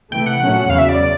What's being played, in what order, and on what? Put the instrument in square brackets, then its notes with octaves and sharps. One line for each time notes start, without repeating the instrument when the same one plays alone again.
[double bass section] C3 E3 A3 [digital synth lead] G5
[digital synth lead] F#5
[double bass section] A#2 F#3 A3 C#4
[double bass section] E2 C#3 F#3 [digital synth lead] F5
[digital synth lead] E5
D5